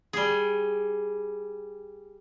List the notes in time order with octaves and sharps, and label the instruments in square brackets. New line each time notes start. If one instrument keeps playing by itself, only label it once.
[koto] G3 G#4